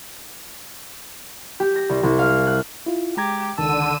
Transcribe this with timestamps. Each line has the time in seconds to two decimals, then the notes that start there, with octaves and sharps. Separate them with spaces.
1.60 G4
1.76 A#6
1.89 C2
2.03 C2
2.19 F5
2.47 F#6
2.86 E4 F4
3.17 G#3 G4 A#5 G#6
3.58 C#2 D3 D#3 A5 E6 D#7